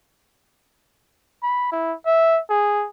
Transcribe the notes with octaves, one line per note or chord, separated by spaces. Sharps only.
B5
E4
E5
G#4